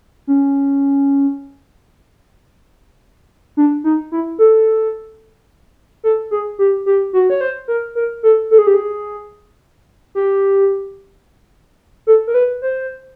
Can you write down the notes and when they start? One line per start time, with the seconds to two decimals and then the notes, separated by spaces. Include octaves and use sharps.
0.27 C#4
3.57 D4
3.84 D#4
4.12 E4
4.39 A4
6.04 A4
6.31 G#4
6.59 G4
6.86 G4
7.13 F#4
7.30 C#5
7.41 C5
7.68 A#4
7.95 A#4
8.23 A4
8.51 A4
8.58 G#4
8.67 G4
8.74 G#4
10.15 G4
12.07 A4
12.27 A#4
12.34 B4
12.62 C5